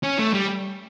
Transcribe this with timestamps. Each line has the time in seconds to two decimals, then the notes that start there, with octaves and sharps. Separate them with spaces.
0.03 C#4
0.18 A3
0.34 G3